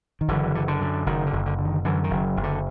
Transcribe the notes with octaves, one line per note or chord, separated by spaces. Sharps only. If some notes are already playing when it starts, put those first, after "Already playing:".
D#3
F#1 D3 E3
D3
D3
F#2
F#1 D#3
D3
F#1
D3
D3
D#3
F#2 D3 E3
D#3
F#1
F#1
D3